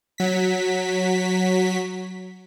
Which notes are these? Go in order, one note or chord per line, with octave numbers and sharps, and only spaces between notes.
F#3 B6